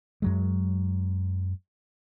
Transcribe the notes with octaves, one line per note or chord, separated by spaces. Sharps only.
F#2 F#3 G#3